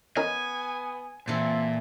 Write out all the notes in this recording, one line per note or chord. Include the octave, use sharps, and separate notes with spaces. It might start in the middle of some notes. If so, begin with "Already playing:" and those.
B3 C#4 D#4 A#4 G#5
A#2 E3 C4 A4 G#5